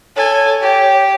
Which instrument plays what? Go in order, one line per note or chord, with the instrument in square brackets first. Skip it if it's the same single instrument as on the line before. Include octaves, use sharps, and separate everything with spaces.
[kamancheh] A4 G#5 [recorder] C#5
[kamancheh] G4